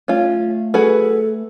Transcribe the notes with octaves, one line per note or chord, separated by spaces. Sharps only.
A3 C#4 F4
F#4 G#4 A4 B4